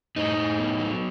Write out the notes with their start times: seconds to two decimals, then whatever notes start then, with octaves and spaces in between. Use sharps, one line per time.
0.16 A2 D#4
0.37 A2
0.59 B3
0.80 F#3